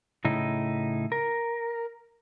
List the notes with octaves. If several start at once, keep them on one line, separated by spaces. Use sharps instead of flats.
A2 C#3 D#4 E4
A#4